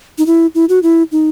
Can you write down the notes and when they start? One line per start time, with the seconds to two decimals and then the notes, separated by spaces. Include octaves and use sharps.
0.18 D#4
0.26 E4
0.55 E4
0.69 F#4
0.83 E4
1.12 D#4